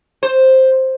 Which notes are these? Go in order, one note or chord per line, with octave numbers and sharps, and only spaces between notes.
C5